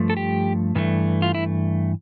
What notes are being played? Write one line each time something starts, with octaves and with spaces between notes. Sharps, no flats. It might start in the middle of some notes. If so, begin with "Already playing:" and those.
Already playing: G2 F3 A3
A4
G4
G2 E3 A3
F4
E4